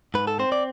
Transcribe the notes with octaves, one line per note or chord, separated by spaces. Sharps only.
G#2 B4
A4
C4 C5
D5